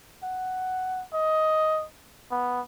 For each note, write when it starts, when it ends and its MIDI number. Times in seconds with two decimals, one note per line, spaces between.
0.23 1.04 78
1.13 1.85 75
2.32 2.61 59